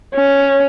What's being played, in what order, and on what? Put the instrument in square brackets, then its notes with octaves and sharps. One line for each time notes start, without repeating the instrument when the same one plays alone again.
[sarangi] C#4